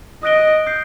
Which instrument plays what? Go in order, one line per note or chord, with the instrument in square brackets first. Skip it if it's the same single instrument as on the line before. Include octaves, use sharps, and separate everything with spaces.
[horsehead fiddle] D#5 [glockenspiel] D#6 F#6 A#6 D7 G7
[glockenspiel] D#6 G6 C7